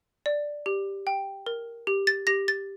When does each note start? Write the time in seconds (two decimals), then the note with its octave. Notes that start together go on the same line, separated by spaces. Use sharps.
0.26 D5
0.66 G4
1.07 G5
1.46 A#4
1.87 G4
2.07 A6
2.27 G4 A#6
2.48 A6